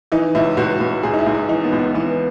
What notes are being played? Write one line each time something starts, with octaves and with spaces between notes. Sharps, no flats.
E3 D#4
C#2 E4
C#2 F#4
C#2
C#2 G#4
D#4
E4
C#2
D#4
E3 D#4
B3
C#2
B3
E3 B3